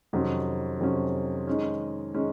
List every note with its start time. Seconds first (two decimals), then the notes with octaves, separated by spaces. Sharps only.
0.13 F2 C3 D#3 F#3 C#4
0.80 F2 C3 D#3 F#3 C#4
1.47 D#3 G#3 C#4
2.14 D#3 G#3 C#4